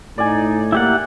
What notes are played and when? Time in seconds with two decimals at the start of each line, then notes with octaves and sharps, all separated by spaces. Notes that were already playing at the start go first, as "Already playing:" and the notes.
0.18 A2 D#4 D5 G#5
0.72 A#3 E4 G4 F#5